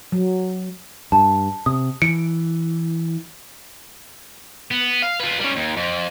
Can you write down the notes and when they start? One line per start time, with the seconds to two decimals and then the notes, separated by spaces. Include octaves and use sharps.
0.12 F#3
1.12 G2 A5
1.66 C3 D#6
2.02 E3 C#7 D7
4.71 B3
5.02 F5
5.20 F4 B4
5.40 G3 C#4
5.56 D#2
5.76 F2